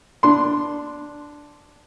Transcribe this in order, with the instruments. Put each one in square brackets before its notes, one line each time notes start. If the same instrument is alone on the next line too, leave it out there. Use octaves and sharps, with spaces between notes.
[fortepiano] D4 C6